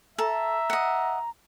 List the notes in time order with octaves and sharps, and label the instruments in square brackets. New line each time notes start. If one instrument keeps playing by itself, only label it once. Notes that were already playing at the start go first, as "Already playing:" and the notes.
[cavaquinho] A4 [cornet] E5 [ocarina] A#5
[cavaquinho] D#5 F#5